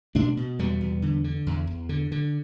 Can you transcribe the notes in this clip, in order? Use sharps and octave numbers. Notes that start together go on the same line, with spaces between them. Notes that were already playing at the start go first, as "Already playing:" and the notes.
B2 A3 D4
B2
E2 G3 B3
E2
D3
D3
E2
E2
D3
D3